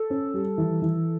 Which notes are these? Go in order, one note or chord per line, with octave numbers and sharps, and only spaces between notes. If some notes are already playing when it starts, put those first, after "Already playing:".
Already playing: A4
C#4
G3
E3
E3